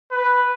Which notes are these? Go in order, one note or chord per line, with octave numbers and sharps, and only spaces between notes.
B4